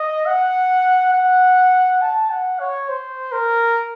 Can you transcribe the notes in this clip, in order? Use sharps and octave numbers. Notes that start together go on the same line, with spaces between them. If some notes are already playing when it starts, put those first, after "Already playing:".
Already playing: D#5
F#5
F#5
A5
F#5
C#5
C5
A#4